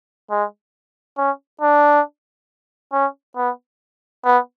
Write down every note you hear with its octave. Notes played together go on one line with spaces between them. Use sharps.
G#3
C#4
D4
C#4
B3
B3